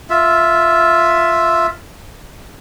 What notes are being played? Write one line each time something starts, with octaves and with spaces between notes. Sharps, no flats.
F4 E5